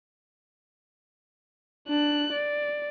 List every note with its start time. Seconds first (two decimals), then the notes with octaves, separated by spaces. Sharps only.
1.88 D4 F#6
2.32 D5